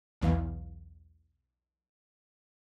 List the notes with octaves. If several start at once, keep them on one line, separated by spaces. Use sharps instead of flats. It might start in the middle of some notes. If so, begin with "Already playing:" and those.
B1 E2 E3 F5